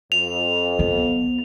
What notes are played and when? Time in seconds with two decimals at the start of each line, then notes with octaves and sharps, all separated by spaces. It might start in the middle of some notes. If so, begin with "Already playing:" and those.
0.12 F2 F7
0.79 B3